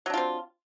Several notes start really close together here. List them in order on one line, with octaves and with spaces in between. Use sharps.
F#3 D4 F4 C4